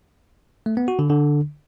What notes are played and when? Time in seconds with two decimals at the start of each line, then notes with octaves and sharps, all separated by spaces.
0.66 A3
0.77 B3
0.88 F#4
0.99 D3
1.10 D3